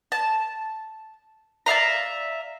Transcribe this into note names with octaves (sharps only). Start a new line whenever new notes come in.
A5
D5 E5 F5 A#5